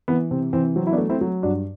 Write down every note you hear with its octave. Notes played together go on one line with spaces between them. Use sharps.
E3 B3
C3 C4
E3 C4
F#3 C4
E4
B3 D4
A3
C4 E4
F#3
G2 D4 F#4